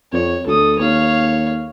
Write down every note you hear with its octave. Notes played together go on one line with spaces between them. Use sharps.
F2 C#5
D2 A4 D#6
D#2 C#5 F5